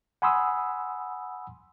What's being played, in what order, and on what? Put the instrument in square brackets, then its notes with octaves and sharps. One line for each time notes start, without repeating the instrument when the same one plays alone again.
[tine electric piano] F#5 G#5 B5 C6 D#6 E6